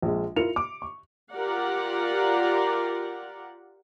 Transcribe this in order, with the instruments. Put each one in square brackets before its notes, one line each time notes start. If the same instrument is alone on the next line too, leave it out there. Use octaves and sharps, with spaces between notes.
[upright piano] A#1 G#3
E4 F4 A#4 C#7 F7
D6
C#6
[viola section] F4 G4 A#4 D5 F#5